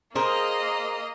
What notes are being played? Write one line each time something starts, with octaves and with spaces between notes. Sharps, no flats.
A#3 G#4 A#4 C5 D#5